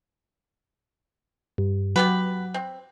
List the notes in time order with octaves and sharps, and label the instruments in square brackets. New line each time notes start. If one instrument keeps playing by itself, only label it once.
[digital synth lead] G2
[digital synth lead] F#3 [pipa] B3 G4 B4
[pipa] C4